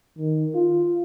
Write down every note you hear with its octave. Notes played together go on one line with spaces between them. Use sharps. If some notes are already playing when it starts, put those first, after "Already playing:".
D#3
F4